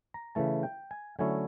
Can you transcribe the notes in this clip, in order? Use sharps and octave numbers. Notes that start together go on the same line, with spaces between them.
A#5
C#3 E3 A3 A5
G5
G#5
D3 F#3 A3 C#4 E4 G#5